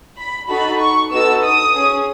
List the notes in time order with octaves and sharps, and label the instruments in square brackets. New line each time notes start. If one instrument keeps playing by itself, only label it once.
[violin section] B5
D#4 F#4 A4 B5
C#6
B3 D#4 F#4 A4 E6
D#6
C#4 G#4